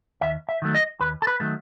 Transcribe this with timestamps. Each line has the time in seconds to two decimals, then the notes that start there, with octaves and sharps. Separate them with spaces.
0.21 D#2 E5
0.49 E5
0.62 D#3 F#3 A3
0.75 D#5
1.00 D#2 B4
1.22 A4
1.27 B4
1.40 D#3 F#3 A3